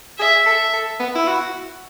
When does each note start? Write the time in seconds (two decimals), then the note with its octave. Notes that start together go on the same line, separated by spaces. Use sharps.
0.19 G#4 E5
0.46 A4
0.73 A4
1.00 B3
1.15 E4
1.27 F#4